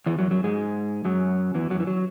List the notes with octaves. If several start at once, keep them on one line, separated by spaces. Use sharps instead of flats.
E2 E3
F#2 F#3
F#2 F#3
G#2 G#3
F#2 F#3
E2 E3
F#2 F#3
E3
F#3